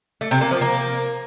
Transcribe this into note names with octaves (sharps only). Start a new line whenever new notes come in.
A3
C3
A#3
F3
A#3